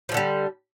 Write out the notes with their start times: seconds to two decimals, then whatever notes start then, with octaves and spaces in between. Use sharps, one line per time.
0.09 F3
0.12 A2
0.14 D3
0.17 G3